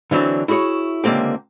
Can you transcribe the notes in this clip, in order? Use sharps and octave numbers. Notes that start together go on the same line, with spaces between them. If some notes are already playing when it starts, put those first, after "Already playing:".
D3 E3 F#3 C4 D4
E4 F#4 G#4 B4 C#5
C#2 D3 A#3 C4 G4